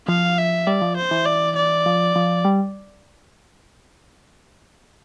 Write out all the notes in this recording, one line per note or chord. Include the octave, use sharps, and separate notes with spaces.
F3 F5
E5
G3 D5
F3
C5
E3
D5
D5
F3
F3
G3